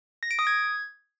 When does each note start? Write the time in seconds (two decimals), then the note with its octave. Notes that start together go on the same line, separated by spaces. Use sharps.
0.23 A#6
0.31 D7
0.39 D#6
0.47 G#6